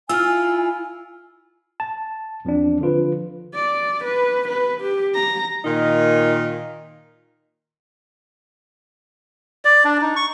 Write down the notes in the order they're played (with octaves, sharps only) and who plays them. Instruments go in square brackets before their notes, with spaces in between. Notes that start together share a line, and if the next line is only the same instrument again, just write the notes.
[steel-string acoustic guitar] E4 F4 [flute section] G#5 [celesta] E6 F6
[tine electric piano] A5
E2 F3 C4 D4
D3 F3 F4 B4
[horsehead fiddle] D5
B4
B4
G4
A#5
[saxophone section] A#2 D#3 D#4 F4
[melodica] D5
D4
D#4
C#6